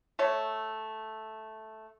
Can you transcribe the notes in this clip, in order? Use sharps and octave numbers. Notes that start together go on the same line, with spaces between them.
A3 C#5